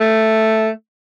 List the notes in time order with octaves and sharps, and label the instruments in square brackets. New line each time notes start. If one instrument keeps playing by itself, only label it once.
[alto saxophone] A3